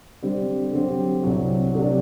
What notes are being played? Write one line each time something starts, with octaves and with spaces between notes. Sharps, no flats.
D3 G3 C4 G4
D3 F#3 C4 G4
C2 C3 F#3
C3 F#3 A3 D4 G4